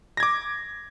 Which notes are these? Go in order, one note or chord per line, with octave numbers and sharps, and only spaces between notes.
D6 G#6 A#6